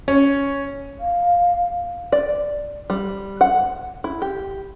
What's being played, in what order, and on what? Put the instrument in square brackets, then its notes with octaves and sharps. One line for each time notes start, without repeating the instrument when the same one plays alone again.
[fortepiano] C#4
[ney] F5
[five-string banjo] D5
G3
F#5
E4
G4